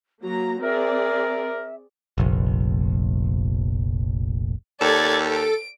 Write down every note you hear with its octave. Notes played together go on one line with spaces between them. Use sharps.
F#3 A#3 F#4 A#5
C4 G#4 A#4 D5 E5
F1 A#1
D#2 A4 D5 G#6
D7